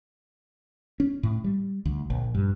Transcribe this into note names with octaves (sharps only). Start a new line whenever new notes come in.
C#4
A2
G3
D2
A#1
G2